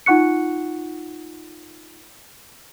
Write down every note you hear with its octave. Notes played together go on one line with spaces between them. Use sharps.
D#4 F4 F#5 C#6 F#6 C#7